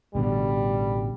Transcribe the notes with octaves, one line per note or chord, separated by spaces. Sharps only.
A1 B2 D3 G3